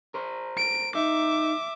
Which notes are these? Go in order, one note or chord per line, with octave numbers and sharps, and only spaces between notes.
A#4 C5
D7
D#4 E5 D6